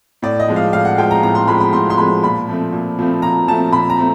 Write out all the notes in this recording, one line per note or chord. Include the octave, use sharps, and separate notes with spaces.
A2 D5
D#5
F3 G#3
F5
A2 F5
F#5
F3 G#3 G5
A#5
A2 A#5
C6
F3 G#3 B5
B5
A2 C6
C6
F3 G#3 B5
A#2 B5
F3 A3 C4
A#2
F3 A3 C4
A#2 A#5
F3 A3 C4 A5
A#2 B5
A#5
A3 C4